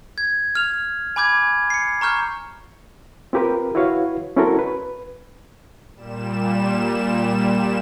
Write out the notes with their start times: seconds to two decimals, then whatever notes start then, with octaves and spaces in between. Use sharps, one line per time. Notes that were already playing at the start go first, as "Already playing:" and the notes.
0.18 G#6
0.55 F6 F7
1.16 G#5 B5 D6 G6 G#6
1.70 C7 C#7
2.01 A#5 C#6 F6 G6
3.33 C4 F4 G4 A#4 B4
3.75 E4 F#4 B4 C#5 F5
4.36 C4 C#4 E4 F#4 A4 A#4
4.59 B4
5.96 A#2 G3 E7